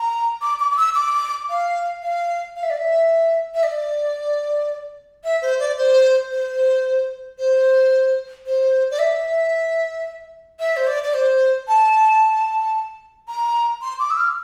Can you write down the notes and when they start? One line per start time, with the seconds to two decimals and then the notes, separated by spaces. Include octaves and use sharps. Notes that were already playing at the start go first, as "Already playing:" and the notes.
Already playing: A#5
0.42 D6
0.60 D6
0.71 D6
0.77 E6
0.95 D6
1.49 F5
2.02 F5
2.56 F5
2.63 E5
2.70 D5
2.77 E5
3.55 E5
3.63 D5
5.24 E5
5.42 C5
5.60 D5
5.78 C5
6.31 C5
7.38 C5
8.46 C5
8.91 D5
8.99 E5
10.59 E5
10.77 C5
10.87 D5
11.03 D5
11.14 C5
11.68 A5
13.28 A#5
13.82 C6
13.99 D6
14.10 E6
14.17 F6